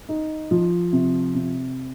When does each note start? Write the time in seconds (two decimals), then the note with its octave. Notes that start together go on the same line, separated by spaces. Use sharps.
0.09 D#4
0.51 F3
0.93 C3
1.35 C3